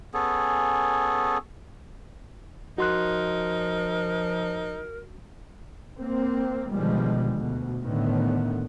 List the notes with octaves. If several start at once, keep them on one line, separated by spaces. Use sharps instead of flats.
B3 C#4 G#4 A4
F3 D#4 F#4 A#4 C6 F#6
A#3 C4
B2 D3 D#3 F3 G3 G#3
D2 B2
A2 D3 D#3 B3